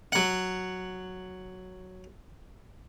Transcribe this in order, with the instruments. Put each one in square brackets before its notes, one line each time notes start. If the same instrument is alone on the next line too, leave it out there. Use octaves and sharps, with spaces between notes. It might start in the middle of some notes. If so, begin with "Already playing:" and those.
[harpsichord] F#3 F#5